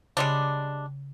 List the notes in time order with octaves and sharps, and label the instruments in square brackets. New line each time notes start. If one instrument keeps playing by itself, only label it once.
[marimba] C#3 [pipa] G3 G#3 D4